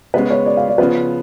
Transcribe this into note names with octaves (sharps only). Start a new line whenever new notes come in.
C#3 G#3 B3 B4
C#5
D5
F5
D5
C#3 F3 B3 F4 B4